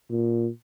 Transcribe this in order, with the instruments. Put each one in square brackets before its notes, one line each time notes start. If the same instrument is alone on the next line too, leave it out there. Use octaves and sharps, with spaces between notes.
[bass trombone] A#2